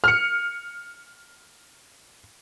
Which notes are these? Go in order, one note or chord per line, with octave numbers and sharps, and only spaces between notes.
F6 C#7